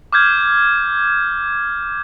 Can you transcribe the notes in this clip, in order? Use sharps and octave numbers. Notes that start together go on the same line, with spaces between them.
D6 F6 G6 G#6